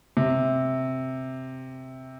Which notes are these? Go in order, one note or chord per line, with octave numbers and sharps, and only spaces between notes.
C3